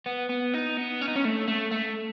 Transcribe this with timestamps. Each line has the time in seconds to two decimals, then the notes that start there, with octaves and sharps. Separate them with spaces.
0.06 B3
0.29 B3
0.54 D#4
0.77 B3
1.01 C#4
1.08 D#4
1.16 C#4
1.25 A3
1.48 A3
1.72 A3